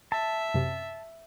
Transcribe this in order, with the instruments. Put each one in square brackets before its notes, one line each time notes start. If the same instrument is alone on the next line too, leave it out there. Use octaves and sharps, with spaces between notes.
[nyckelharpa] E5 [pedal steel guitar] A5
[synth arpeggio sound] F#2 C3